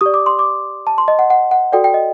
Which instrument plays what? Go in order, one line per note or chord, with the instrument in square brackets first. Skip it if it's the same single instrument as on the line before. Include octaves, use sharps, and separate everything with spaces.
[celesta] G4 D5 D#6
D6
C6
D6
A5
C6
D#5
F#5
F#5
F#5
F#4 A4 D5 G5
G5
D#5